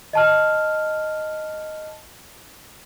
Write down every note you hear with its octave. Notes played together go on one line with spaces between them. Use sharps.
D#5 A5 F6